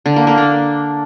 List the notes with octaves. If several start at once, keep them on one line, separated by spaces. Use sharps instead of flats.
D3
A#3
A#3
D4